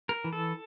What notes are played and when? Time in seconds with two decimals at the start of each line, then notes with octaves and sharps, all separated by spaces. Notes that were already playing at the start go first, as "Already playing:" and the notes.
0.09 A#4
0.24 E3
0.33 A4